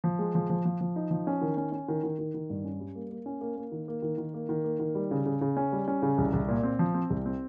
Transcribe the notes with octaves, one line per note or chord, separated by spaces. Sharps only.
F3
G#3
F3
F3
F3
F3
D#4
F3
C#4
D#3
C#4
C#4
D#3
D#3
D#3
D#3
G2
C#4
G3
A#3
A#3
C#4
A#3
A#3
D#3
A#3
D#3
D#3
A#3
D#3
A#3
D#3
G3
C#3
C#3
C#3
C#4
G3
C#4
C#3
C2
C2
A#2
C4
F3
C4
C2
C4